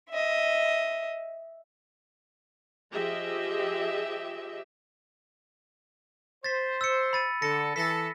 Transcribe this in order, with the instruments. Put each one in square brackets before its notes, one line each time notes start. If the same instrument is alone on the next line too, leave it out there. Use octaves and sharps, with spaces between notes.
[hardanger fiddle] D#5 E5
[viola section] F3 G4 G#4 D#5 E5
[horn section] C5 [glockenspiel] A6 B6
[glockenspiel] E6 C#7
B5 A6 D#7
[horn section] D3 A4 [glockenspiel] A#6 C#7
[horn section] E3 A4 [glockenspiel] A#6 B6